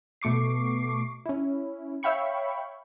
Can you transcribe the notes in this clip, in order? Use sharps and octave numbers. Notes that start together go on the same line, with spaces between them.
B2 A3 C#6 D6 C7
C#4 E4
C#5 E5 F5 G5 B5 C#6